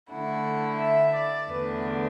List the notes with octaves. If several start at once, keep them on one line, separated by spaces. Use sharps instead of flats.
D3 A3 E4 F#5
E5
D5
E2 D3 A3 D4 B4